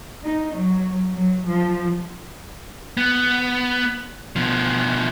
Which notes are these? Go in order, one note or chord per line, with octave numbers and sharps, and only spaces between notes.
D#4
F#3
F#3
F3
B3
B2 F3